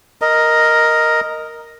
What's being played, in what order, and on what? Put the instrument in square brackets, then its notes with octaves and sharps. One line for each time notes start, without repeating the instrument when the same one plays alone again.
[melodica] A#4 D#5